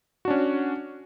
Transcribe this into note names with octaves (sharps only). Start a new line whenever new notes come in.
C#4 D4 F#4